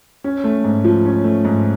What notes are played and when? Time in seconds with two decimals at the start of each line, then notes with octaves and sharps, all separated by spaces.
0.24 C#4
0.44 A3
0.64 G#2
0.84 F3
1.05 C#4
1.24 A3
1.45 G#2